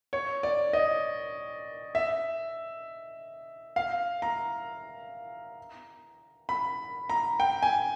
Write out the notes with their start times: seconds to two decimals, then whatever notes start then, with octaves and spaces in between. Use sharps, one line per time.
0.13 C#5
0.43 D5
0.73 D#5
1.95 E5
3.76 F5
4.22 A#5
6.49 B5
7.10 A#5
7.40 G5
7.62 G#5